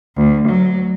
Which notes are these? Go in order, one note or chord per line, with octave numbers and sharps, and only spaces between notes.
D2
F#3